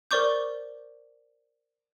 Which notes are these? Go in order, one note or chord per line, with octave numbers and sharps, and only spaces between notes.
A#4 C5 D5 C#6 D6 G6